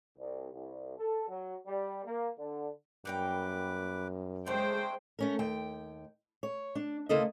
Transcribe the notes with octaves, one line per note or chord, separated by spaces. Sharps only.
C2
C2
A4
F#3
G3
A#3
D3
F#2 G3 A#3 B4 G5 D6
C#3 G#3 A3 C4 D4 C5 C#5 G5
A3 C#4 A#4
D#2 G5
C#5
D4
D2 C#3 A#3 E4 A4 D#5